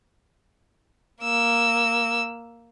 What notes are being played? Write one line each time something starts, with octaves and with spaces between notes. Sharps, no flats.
A#3 E6